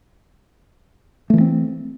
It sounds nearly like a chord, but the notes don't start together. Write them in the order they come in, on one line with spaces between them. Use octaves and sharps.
A3 E3 A#3 C4